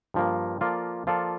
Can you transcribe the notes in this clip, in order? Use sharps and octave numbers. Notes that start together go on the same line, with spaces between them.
G2 F3 A#3
F3 A#3 F4 A4 D5
F3 A#3 F4 A4 D5